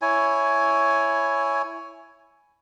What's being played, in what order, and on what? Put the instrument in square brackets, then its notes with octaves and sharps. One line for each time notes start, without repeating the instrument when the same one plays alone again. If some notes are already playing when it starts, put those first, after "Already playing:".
[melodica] E4 C#5 G#5